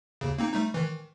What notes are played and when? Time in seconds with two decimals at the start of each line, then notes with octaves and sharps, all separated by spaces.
0.21 D#2 C#3
0.38 A#3 C4 D#4
0.54 G3 A3 D#4
0.74 D#3 E3